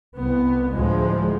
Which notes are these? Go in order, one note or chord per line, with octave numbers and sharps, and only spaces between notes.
C2 B3
D2 A2 F3 G#3